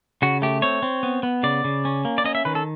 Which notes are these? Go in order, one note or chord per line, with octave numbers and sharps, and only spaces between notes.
C#3 F#4
A3 G4
C4 C#5
C4
B3
B3
C#3 D5
C#3
C#4
A#3
D5
C#4 D#5
E5
D#3 B4
A4